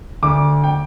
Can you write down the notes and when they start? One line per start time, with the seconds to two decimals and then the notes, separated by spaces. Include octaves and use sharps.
0.23 D2 D3 D6
0.64 G5